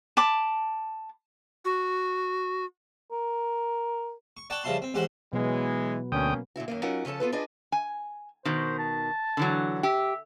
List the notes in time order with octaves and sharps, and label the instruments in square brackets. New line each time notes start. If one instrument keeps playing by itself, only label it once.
[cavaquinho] A5 B5 D6
[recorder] F#4
[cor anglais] A#4
[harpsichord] C#6
D5 F#5 G5 A5 C#6
G2 C#3 F3 E4 A5 C6
C4
A1 G#2 G4 C5 F#5
[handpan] B2 F#3 B3 [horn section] E3 G#3
[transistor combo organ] D2 G5 D#6 [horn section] A#3 C#4
[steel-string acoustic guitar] A#2 D3 E4 F#4
F#2 D#3 A#3
F#3 C#4 D#4 F4 A#4 F#5
C#3 F3 C#4 A4 A5
B3 F4 A4 B4
D4 F4 G#4 B4 D5 D#5
[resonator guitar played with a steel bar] G#5
[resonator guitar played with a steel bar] B2 D#3 [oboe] C5
[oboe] A5
[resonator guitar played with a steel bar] D3 E3 F#3
[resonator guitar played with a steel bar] G4 [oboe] E5